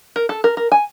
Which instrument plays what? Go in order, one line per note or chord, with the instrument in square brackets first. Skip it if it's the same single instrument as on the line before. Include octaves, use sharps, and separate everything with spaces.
[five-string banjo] A#4
A4
A#4
A#4
G#5